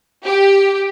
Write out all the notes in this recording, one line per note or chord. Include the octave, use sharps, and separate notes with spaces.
G4